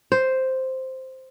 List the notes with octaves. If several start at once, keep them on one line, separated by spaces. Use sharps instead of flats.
C5